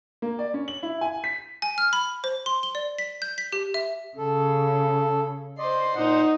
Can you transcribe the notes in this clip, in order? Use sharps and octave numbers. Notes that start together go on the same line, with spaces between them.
A#3
D5
C#4
F#7
E4
G#5
B6
G#5
F6
B5
C5
C6
G7
D5
B6
G6
B6
G4
E5
C#3 A4
C5 D5 D#5 C6
A#2 D#4 C5 F#5